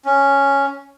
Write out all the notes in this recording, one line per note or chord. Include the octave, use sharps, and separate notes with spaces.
C#4